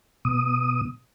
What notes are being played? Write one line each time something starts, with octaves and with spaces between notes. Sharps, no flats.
B2 D#6